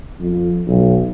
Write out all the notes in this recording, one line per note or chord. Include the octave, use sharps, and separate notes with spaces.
F2
B1